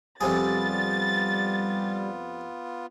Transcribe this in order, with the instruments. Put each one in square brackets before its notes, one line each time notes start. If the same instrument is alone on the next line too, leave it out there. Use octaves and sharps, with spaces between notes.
[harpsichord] F2 C3 G#4 [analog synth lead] G3 [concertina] B3 F4 [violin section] A6